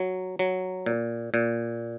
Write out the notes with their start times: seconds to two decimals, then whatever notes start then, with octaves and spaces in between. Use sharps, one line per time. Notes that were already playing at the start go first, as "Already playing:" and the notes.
Already playing: F#3
0.39 F#3
0.86 A#2
1.34 A#2